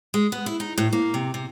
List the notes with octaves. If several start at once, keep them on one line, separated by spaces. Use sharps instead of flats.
G#3
B3
E4
D#4
A2
A#3
C3
C3